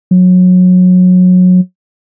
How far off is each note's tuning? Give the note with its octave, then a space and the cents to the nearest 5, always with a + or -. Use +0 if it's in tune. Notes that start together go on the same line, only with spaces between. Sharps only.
F#3 -25